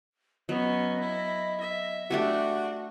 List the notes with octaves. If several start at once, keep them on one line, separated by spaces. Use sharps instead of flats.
F#3 B3 C#4 D#5
E4
E5
A3 D4 F#4 G4 E5